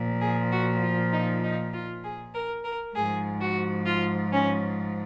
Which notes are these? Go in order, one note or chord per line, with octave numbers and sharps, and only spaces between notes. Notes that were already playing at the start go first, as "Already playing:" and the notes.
Already playing: A#2 F3
G#4
F#4
F4
D#4
D#4
F4
G#4
A#4
A#4
G#2 F3 G#4
F#4
F4
C#4